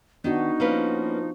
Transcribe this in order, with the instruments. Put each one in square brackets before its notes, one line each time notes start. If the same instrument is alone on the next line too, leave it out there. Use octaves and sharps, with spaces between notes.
[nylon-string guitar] D#3 [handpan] B3 D4 F#4 [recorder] D#4
[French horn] F3 [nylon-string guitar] A#3 C#4 B4